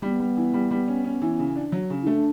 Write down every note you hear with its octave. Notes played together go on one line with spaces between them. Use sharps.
G3 B3
G3
E3
G3
G3
C#4
C#4
E3
C#3
D4
F#3
C#3
E4
A3 D4